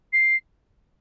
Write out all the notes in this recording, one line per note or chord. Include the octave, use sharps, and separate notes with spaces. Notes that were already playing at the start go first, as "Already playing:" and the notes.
C7